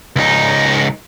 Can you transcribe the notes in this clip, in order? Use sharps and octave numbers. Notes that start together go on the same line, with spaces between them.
C#2 D#4